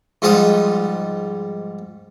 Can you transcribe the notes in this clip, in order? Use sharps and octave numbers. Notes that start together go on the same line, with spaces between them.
G#2 F3 G3 F#5 D#6